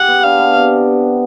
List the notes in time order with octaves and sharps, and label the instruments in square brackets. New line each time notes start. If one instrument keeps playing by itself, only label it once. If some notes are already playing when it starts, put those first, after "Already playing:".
Already playing: [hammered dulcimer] G4 [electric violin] F#5
[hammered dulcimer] B3
[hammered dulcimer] D4 [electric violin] F5
[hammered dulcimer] B3
C3